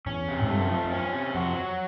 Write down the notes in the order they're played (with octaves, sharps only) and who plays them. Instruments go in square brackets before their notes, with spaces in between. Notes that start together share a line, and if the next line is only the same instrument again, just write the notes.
[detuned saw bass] E2 [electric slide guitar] C#4
[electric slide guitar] C3
[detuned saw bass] G#2
[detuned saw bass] G2 [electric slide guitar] A3
[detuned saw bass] F#2
[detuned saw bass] F2 [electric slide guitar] F3
[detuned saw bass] F2
[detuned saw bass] F#2 [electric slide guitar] C#4
[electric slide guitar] C3
[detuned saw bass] F2 [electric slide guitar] F#4
[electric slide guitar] F#3